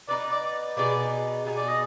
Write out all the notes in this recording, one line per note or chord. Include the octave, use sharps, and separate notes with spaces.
B3 D#4 B4 D5
D5
B2 B3 D#4 G#4 D5
B2 B3 D#4 G#4
D5
D#5